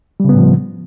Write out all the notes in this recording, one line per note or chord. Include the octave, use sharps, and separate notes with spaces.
A2 C#3 F3 G3 B3